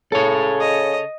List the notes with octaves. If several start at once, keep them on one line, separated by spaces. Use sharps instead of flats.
C#3 A4 C#5
D#5